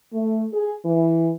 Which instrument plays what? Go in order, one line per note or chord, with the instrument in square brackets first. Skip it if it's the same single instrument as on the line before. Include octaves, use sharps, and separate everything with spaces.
[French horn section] A3
G#4
E3